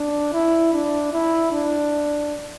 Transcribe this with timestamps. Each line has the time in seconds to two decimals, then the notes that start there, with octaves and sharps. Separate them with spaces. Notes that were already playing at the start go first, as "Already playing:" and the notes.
Already playing: D4
0.33 E4
0.73 D4
1.13 E4
1.52 D4